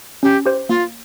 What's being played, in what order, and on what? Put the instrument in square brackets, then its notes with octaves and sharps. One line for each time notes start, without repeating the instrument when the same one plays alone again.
[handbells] C#4 [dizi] G4
[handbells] G4 C5
[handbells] A#3 [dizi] F4